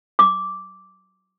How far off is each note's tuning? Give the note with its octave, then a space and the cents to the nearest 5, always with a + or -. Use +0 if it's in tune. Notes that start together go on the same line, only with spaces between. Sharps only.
D6 -10